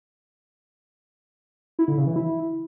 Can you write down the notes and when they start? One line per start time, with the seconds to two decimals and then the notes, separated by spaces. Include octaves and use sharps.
1.79 E4
1.88 D3
1.97 C#3
2.07 E3
2.16 E4